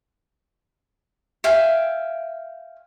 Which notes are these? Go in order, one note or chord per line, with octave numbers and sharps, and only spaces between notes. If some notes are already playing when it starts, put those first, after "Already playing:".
E5 F5 G5 G#5